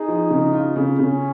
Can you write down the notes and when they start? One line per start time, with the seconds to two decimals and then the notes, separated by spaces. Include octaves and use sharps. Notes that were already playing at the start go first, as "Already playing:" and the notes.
Already playing: D#4 G#4
0.08 F3
0.30 C#3
0.53 F4
0.76 C#3
0.99 C#3 C#4